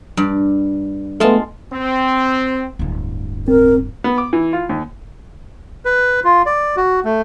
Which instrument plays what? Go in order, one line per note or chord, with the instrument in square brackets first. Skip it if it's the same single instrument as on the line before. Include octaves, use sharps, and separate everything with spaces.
[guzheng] G2 D5
[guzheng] G#3 F4 A5 [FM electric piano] A3 B3
[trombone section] C4
[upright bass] D1 G2
[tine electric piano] C4 [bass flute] A#4
[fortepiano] B3
D6
E3
F4
D#2
[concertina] B4
F4
D5
F#4
A3